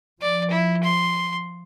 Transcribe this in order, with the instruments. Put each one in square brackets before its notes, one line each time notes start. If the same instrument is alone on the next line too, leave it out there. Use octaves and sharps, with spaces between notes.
[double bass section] F3 [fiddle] D5
[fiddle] E4
C6